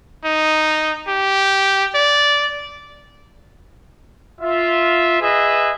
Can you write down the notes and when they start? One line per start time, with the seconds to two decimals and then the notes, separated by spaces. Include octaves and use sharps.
0.25 D#4
1.08 G4
1.95 D5
4.41 F4 E5
5.21 G#4 B4 D#5 E5